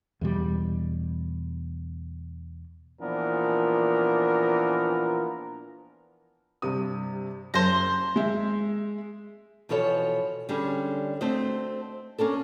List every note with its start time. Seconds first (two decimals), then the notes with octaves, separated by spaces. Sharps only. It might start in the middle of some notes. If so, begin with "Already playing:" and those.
0.21 E2 B2 G3
3.01 A#2 E3 F3 B3 D4 A#4
6.62 G2 C3 D#6
7.54 F#1 F#2 C5 A5 A#5
8.16 G#3 E5
9.69 B2 E3 F3 A4 C#5
10.49 D3 G3 C#4 G#4
11.21 A3 C4 F#4 C5 D#5
12.18 A#3 C#4 D4 A4